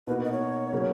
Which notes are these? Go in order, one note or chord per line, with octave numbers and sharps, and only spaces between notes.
B2 A#3 D#4 F#4 B4
D#5
C#5
C#3 F#3 A#3 C#4